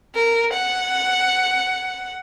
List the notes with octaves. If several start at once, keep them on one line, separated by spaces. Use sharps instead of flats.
A#4
F#5